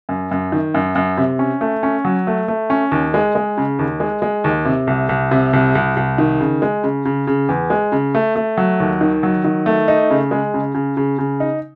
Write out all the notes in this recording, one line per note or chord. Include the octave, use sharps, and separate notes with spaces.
F#2
F#2
D#3
F#2
F#2
C3
C#4
A3
C#4
F#3
A3
A3
C#4
D#2
G#3
G#3
C#3
D#2
G#3
G#3
D#2
C3
C2
C2
C3
C2
C2
C2
D#3
C#3
G#3
C#3
C#3
C#3
E2
G#3
C#3
A3
A3
F#3
D#2
D#3
F#3
D#3
A3
D#4
C#3
G#3
C#3
C#3
C#3
C#3
D#4